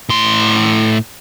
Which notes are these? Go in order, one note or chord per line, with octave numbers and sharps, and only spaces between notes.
A2 C6